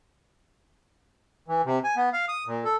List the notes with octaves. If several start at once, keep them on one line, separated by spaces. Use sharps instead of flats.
E3
C3
G#5
B3
F5
D#6
A#2
A4